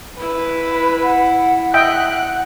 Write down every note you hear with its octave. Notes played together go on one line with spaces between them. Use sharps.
E4 B4
F#5
D#5 E5 F#5 G5 F#6